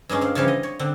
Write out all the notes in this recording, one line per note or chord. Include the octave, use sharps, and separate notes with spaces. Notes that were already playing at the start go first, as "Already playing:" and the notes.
G2 G#3 C#4 D#4
C4 F5
C#3 E3 F3 G3
D#5
C#5
D3 C4